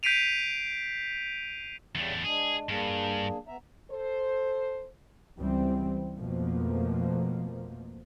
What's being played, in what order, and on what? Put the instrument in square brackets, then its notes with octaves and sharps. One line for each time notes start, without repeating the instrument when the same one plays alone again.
[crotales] G6 B6 C7 D7 D#7 F7
[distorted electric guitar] E2 A3 [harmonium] C#3 G3
[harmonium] G#3 D4 [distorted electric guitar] G#4
[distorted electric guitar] G2 [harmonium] A#3 D4 G#4
[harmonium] B3 E5 A#5
[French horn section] A4 C5
[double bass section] C#2 E3 G3 C4
F2 B2 F3 A3 A#3